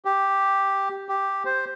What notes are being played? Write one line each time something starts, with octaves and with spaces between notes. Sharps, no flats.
G4
G4
C5